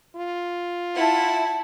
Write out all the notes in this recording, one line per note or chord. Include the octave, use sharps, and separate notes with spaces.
F4
E4 F#5 A5